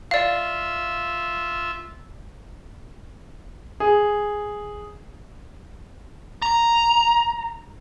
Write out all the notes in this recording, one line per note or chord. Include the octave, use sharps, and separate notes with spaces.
F4 D5 E5 F5
G#4
A#5